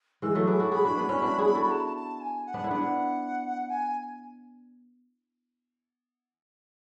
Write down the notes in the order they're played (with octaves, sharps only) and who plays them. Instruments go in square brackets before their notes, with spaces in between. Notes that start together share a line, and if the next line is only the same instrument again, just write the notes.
[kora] E3 G#3 [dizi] E6
[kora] F#3 A3
[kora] E4 G#4 [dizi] D6
[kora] F#4 A4
[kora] E4 G#4 [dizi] B5
[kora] D4 F#4
B3 D4
C#4 E4
D4 F#4
E4 G#4
F#4 A4
[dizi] A5
A5
G#5
F#5
[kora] B3 D4
E4
[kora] B3 D4 [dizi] F#5
[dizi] G#5